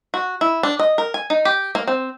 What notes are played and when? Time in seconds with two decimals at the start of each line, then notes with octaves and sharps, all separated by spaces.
0.14 F#4
0.41 E4
0.63 D4
0.79 D#5
0.98 A#4
1.14 G#5
1.30 D#4
1.45 G4
1.75 A#3
1.87 C4